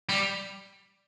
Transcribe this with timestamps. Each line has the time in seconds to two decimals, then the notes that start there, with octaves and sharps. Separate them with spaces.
0.09 G3